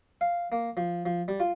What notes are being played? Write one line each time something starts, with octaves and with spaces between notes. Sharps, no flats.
F5
A#3
F3
F3
G3
F4